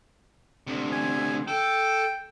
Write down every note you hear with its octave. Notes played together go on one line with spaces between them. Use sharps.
D2 C3
G#5
A4 G5